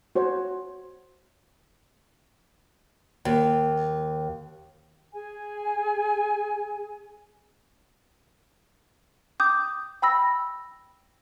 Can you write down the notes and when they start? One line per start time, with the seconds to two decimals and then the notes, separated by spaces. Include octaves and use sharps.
0.16 F#4 C5 C#5
3.25 D#2
5.13 G#4 G#5
9.40 G5 D6 D#6 G6
10.02 G5 B5 E6 A#6